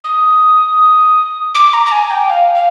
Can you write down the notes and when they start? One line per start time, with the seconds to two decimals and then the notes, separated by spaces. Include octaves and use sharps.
0.04 D#6
1.55 D6
1.73 A#5
1.86 A#5
1.92 G#5
2.11 G5
2.30 F5
2.55 F5